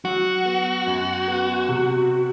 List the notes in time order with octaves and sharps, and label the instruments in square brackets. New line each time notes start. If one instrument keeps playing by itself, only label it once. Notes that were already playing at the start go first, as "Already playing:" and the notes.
[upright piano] F#3 [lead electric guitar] F#4
[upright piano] B3
F#2
B3
C3